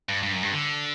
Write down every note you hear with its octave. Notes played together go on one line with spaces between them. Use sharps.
G2
G2
F#2
G2
D3